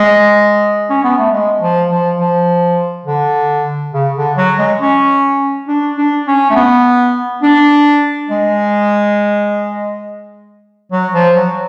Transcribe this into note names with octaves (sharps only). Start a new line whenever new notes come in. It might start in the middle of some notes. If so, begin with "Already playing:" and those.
Already playing: G#3
C#4
B3
A3
G#3
F3
F3
F3
D3
C#3
D3
F#3
G#3
C#4
D4
D4
C#4
A3
B3
D4
G#3
F#3
F3
F#3